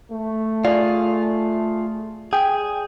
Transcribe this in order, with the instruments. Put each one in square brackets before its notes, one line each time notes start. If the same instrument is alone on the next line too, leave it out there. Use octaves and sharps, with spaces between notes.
[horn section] A3
[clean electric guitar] F4 G#4 [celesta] D5
[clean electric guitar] G#4 [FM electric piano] G5